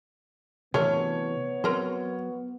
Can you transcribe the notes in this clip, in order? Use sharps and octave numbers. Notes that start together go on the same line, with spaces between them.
C3 E3 F#3 A3 B3 D4 A#4 C#5
F#3 C4 A#4 C5